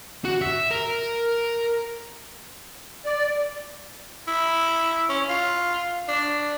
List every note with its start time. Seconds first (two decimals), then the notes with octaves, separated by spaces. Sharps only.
0.25 F#4
0.42 E5
0.71 A#4
3.05 D5
4.28 E4
5.09 C#4
5.29 F4
6.08 D4